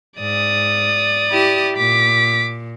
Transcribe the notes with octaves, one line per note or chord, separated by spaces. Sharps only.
G#2 D5 D#6
E4 G4
A#2 D6 B6